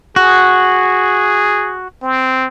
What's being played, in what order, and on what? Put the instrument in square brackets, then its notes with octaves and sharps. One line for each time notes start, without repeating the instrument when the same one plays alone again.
[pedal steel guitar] F#4 [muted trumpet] G#4
[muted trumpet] C4